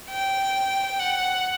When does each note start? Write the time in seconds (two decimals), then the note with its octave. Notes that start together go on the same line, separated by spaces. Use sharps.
0.10 G5
1.00 F#5